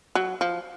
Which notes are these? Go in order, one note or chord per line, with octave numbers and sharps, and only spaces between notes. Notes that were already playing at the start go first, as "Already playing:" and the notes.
F#3
F3